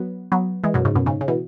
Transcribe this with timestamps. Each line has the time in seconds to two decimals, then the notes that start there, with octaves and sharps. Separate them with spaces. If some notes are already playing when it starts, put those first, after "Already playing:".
Already playing: F#3 B3
0.32 F#3 B3
0.64 E3 G#3
0.74 F#2 B2
0.85 G#2 C#3
0.95 F#2 B2
1.06 G#2 C#3
1.21 C#3
1.28 B2 E3